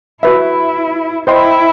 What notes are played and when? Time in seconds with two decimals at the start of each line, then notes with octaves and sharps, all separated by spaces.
0.23 E4 F#4 B4 E5
1.27 E4 C5 D#5 G5 C6